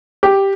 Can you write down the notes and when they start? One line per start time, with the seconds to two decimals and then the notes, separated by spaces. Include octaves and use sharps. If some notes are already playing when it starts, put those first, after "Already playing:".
0.23 G4